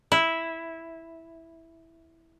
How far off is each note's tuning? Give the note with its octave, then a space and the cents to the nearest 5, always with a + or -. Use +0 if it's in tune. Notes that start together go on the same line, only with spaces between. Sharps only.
E4 -5